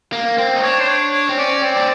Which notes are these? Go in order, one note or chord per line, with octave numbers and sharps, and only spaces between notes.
A#3
C4
D#4
D4 C#5
C5
C#5
C#5
C4
C#4 D5
C4
D4 D5